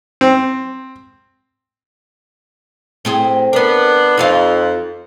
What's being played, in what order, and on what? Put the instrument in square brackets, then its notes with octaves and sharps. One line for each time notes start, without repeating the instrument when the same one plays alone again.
[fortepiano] C4
[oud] A2 C4 G#4
[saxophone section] B3 D4 [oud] A#4 B4
[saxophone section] F2 [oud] D#4 F4 F5